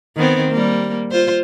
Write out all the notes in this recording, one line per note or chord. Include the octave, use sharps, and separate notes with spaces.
D#3 B3 C4
G3 A#3
F4 C5